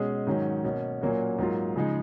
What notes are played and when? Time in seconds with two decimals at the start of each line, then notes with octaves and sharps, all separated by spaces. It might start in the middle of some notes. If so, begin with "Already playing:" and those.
Already playing: B2 G#3 C#4 G#4
0.27 G#2 D#3 F#3 C#4
0.64 B2 A#3 C#4
1.01 A#2 F#3 A#3 C#4 F#4
1.39 G#2 F#3 A#3 F4
1.76 C#3 F3 G#3 D#4